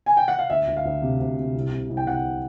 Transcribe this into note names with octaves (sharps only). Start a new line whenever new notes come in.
G#5
G5
F#5
F5
D2 E5
D2
F5
D2
C3
D2
C3
C2
C3
C2
G5
C2 F#5